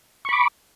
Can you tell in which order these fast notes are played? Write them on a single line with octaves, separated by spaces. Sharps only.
C#6 B5 D6